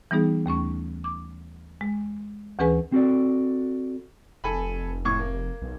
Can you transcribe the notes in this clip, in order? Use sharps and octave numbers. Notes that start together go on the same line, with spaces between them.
E3 G3 B3 D#4 G#4
D#2 A3 C#4 C#6
D6
G#3
D2 E3 C#4 G#4 B4 G#5
C4 F#4 A4 D5
F1 A4 G#5 B5
A2 C#6 G#6
A#3
B1